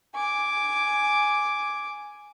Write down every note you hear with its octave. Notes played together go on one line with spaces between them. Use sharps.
G#5 D6